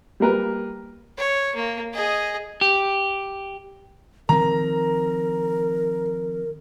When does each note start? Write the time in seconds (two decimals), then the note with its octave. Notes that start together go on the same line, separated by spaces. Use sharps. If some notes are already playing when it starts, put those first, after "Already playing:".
0.20 G3 A#3 A#4 B4
1.18 C#5
1.56 A#3
1.94 G#4 D#5
2.61 G4
4.29 D#3 F3 C4 A#4 A#5